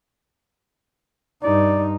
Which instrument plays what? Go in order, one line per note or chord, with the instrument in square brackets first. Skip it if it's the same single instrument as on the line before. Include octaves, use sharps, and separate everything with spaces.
[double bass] G2 D#4 [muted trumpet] D5